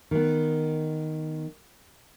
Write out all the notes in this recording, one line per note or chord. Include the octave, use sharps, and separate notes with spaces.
D#3 B3